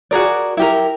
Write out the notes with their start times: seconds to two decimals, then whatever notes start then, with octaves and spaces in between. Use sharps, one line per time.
0.11 F#4 G#4 A#4 D5
0.57 E4 G4 A#4